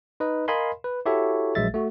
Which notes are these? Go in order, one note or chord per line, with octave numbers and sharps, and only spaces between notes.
D#4 B4 D#5
A#4 D#5 F5 G#5 B5 C6
B4
E4 F#4 G4 A4 C#5 E5
A#1 F#3 G#3 E5 A6
A3 F#4